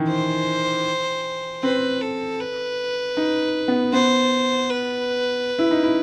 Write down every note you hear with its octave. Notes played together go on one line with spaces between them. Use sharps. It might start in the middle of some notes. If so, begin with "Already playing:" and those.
Already playing: D#3 E3
C5
C4 B4
A4
B4
D#4
B3
B3 C5
B4
E4
D#4
E4